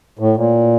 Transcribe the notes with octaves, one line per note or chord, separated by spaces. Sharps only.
A2
A#2